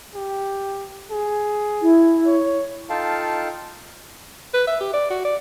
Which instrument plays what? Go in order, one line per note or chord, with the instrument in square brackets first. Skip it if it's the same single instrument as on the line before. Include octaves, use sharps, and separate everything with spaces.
[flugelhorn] G4
G#4
[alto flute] E4
[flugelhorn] C#5
[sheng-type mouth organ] D#4 F4 A4 F5 G5 A5
[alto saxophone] B4
E5
G4
D5
F#4
D5